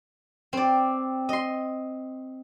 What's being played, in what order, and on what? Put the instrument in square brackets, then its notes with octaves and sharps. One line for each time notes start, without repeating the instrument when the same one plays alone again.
[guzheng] C4 D5
D#5 C6